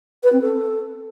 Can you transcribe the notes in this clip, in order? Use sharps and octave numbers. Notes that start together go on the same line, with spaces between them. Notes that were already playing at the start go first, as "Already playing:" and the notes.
B4
C4
A4